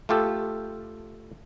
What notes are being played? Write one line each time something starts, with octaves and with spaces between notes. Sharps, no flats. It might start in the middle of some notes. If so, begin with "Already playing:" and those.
A3 F4 G4 A4